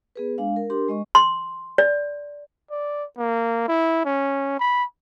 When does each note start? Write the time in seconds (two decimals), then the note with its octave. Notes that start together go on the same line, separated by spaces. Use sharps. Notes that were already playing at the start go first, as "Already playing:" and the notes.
0.16 B3 G#4 B4
0.38 G#3 D4 F5
0.56 A#4
0.70 D4 G4 A#4 C6
0.88 G#3 D#5 C#6
1.15 C6
1.78 D5
2.71 D5
3.18 A#3
3.68 E4
4.05 C#4
4.59 B5